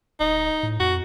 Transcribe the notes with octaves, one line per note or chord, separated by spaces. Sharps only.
D1 D#4
A2
F2 F#4